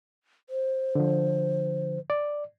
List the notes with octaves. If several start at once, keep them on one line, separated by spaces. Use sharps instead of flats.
C5
D3 F3
D5